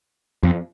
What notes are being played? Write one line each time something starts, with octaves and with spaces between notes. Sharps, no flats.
F2